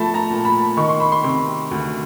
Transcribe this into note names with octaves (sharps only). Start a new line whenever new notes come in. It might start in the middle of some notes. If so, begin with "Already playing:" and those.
Already playing: F3 A3 A5 B5
A#5
A#2
B5
D#3 C#6
C6
B5
C6
C3
D2